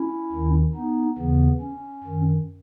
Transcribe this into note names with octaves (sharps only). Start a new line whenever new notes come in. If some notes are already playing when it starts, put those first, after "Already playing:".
Already playing: C#4 E4
D#2 D#3
B3 D#4
D#2 C#3 E3 B3
C#4
F#2 D#3